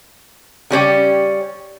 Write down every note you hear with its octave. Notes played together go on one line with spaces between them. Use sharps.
C#3 G3 C#4 G4